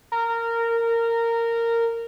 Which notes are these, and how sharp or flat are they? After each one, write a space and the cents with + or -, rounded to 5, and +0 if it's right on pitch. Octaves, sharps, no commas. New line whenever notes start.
A#4 -15